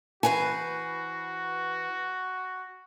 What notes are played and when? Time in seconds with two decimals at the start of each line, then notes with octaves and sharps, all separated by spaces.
0.23 E3 F#4 B4 C5 G#5